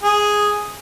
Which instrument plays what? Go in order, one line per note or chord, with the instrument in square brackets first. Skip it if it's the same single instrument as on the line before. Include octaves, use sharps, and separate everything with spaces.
[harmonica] G#4